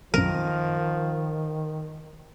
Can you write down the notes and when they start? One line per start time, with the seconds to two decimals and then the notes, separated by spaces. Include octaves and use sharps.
0.14 B1 F#2 D#3 F3 A#4